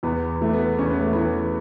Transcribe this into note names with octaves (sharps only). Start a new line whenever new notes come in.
E2 B3
E3 A3
B3
E2 C#4
B3
A3
E3 B3